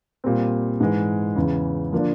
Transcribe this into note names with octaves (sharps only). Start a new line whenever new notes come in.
A#2 G3 C4
G#2 E3 G#3
E2 C#3 E3
D3 F3 A#3 D4 F4